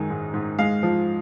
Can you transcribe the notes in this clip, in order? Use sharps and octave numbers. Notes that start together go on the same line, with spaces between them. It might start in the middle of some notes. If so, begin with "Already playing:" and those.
Already playing: F#2 D#3 G#3
G#2
G#2
G#3 F5
F3